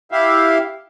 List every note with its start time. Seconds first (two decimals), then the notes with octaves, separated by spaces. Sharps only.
0.12 E4 G4 E5 F5